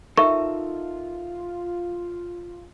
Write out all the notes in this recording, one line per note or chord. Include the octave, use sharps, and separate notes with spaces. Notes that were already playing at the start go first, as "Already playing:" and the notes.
D#4 F4 A4 A#4 D#5 E5 C#6